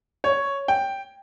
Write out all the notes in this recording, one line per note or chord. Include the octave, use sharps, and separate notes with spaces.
C#5
G5